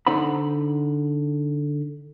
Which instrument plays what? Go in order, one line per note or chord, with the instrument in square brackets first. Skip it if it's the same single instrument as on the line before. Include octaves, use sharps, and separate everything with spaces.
[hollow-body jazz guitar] D3 D#4 C5 F#5 B5